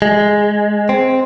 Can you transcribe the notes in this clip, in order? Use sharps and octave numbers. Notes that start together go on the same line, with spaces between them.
G#3
C4